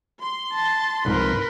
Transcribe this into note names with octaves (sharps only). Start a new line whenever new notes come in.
C6
A5
C2 G#2 F3 A#4 B4